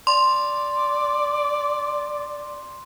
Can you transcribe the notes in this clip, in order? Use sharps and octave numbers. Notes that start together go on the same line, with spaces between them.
D5 C6